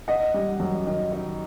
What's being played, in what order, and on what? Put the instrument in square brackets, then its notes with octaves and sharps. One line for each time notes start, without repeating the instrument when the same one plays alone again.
[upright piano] D#4 D#5 F#5
G3
F#2
D#3
D#4